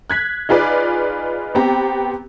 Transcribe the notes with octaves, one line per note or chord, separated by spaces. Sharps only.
F#6 G#6 B6
D#4 F4 G#4 B4 D5
B3 C4 G4 A#5